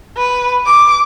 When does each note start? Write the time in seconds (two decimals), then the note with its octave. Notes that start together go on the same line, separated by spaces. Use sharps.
0.17 B4
0.66 D6